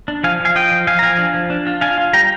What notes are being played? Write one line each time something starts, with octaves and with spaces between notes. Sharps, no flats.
D4
F3 F5 G#5
F3
F5 G#5
F4 D#5 G5
F3
F3 F5 G#5
A#5
F3 F5 G#5
D4
F3
D4
F4
D4 F5 G#5
F4
G3 G5 A#5